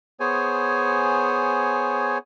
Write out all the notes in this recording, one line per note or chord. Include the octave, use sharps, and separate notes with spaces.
B3 G#4 C5 C#5 G#5